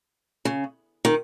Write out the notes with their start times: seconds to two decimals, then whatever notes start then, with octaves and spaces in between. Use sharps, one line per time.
0.45 C#3
1.05 D#3